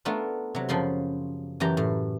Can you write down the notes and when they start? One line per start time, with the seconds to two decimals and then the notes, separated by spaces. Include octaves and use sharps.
0.05 A3 B3 D4 F4 A#4
0.55 C3 F#3
0.69 F#2 C#3 F3 B5 C6
1.60 F#2 E3 G4 A#5
1.77 A2